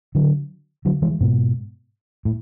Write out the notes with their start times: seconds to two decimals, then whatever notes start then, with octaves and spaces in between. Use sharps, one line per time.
0.15 D3 F#3
0.85 D3 F#3
1.02 E3 G#3
1.21 G#2 B2
2.25 A2